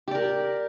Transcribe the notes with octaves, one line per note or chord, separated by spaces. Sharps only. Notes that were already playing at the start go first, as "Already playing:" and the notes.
G4 A#4 D5